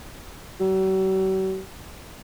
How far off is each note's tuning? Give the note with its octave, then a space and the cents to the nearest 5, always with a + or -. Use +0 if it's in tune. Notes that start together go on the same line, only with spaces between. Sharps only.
F#3 +45